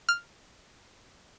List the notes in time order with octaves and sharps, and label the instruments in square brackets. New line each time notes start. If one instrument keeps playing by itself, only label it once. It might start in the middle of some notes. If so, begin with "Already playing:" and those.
[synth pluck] F6